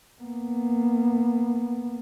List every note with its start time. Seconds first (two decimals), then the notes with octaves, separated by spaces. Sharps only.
0.22 A#3 B3